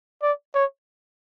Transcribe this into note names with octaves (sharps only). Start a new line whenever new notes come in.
D5
C#5